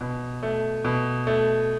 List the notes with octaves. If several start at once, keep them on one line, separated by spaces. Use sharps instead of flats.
B2
A3
B2
A3